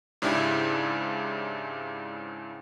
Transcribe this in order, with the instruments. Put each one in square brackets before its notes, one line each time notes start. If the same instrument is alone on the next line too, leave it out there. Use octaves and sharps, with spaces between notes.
[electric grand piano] G#2 C#3 D4 E4 G4